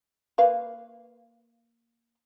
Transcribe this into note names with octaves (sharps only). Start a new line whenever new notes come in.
A#3 B4 F5